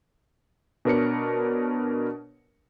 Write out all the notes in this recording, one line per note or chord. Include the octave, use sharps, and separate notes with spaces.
B2 D4 A#4 B4 C#5 C#7